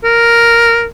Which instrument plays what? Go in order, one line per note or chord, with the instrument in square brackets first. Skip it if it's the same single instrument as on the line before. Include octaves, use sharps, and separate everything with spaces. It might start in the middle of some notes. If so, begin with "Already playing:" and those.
[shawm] A#4